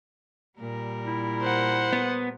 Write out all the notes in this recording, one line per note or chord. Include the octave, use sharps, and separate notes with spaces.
A#2 G3 A#4
E4
C5 F#5
B3